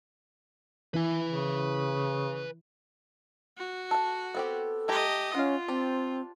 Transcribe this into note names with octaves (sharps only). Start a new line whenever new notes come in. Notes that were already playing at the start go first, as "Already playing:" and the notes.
E3 E4 B4 G#5
C#3
F#4
A4 F#5
B3 C4 G4 A4
A3 G4 D#5 G#5 A#5
C#4 F4 F5 F#5
C4 D4 G4 C5